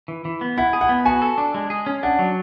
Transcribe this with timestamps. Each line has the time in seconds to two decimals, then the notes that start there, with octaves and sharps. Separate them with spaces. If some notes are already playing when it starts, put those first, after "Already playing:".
0.08 E3
0.25 E3
0.41 B3
0.58 E4 F#5
0.73 G#4
0.81 F#5
0.89 B3
1.05 F#4 G#5
1.22 A4
1.38 D4
1.54 G#3
1.70 G#4
1.86 C#4
2.03 D4 F#5
2.19 F#3